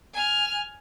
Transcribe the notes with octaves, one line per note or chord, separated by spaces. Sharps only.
G#5 F6